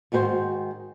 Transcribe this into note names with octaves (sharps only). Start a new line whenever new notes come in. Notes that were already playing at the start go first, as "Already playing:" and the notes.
G#2 D#3 F#4 B4 C5